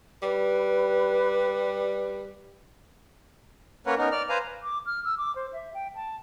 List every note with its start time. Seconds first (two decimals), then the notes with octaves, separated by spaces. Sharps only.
0.23 G3 B4
3.86 A#3 C#4 A#4 B4 C#5 F#5
3.98 B3 C#4 D#4 A#4
4.12 D5 F6
4.29 B4 C5 F5 G#5 A#5
4.63 D6
4.86 F6
5.05 E6
5.18 D6
5.36 C5
5.53 E5
5.74 G5
5.95 A5